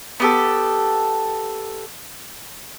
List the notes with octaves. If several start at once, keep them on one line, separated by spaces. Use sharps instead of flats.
B3 G4 A4